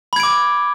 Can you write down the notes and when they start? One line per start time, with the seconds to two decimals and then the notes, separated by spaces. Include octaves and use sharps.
0.13 B5
0.16 G#6
0.20 D7
0.23 D6